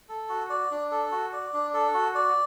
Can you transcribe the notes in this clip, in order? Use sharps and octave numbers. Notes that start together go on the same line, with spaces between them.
A4
F#4
D5
D4
A4
F#4
D5
D4
A4
F#4
D5